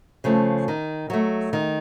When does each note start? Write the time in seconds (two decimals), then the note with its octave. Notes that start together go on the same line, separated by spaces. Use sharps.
0.24 C#3 F3 A3
0.68 D#3
1.10 F#3 A3
1.53 D#3